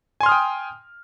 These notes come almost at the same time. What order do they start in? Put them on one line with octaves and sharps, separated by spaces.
G#5 C6 F6 D#6 G5